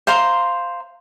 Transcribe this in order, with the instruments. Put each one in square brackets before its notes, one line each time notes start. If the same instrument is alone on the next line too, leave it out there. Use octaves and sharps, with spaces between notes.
[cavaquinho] C5 F5 A#5 C6